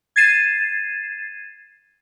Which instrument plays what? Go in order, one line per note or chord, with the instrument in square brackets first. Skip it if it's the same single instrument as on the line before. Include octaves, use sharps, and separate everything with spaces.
[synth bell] G#6 A6 C7 D#7 E7